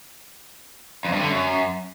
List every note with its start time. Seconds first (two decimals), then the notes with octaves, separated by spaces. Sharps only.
1.05 F2
1.13 G2
1.21 D3
1.30 F#2